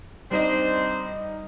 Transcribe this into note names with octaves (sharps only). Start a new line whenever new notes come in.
G3 C4 D4 D#4 C5 D#5